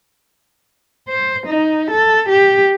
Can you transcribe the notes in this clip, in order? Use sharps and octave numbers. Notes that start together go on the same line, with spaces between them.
C5
D#4
A4
G4